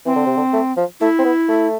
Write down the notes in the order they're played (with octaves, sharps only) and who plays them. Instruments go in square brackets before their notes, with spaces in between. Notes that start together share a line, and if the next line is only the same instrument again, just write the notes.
[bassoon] E3 [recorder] C4
[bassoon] D3
C3
D3
A3
F3
[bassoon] A3 [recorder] E4
[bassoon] C4
B3
A3